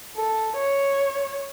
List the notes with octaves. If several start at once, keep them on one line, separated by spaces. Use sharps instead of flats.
A4
C#5